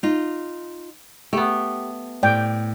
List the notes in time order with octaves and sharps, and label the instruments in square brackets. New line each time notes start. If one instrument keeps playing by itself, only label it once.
[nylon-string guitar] D#4 F4
[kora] A3 B3 [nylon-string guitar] G4
[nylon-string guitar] A2 [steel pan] D5 G5